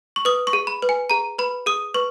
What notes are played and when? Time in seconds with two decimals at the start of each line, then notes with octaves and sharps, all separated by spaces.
0.16 C#6
0.25 B4 D#6
0.47 C#6
0.53 G#4
0.67 B5
0.82 B4
0.89 G#5
1.10 G#4 A#5
1.39 B4 B5
1.66 G#4 D#6
1.94 B4 C#6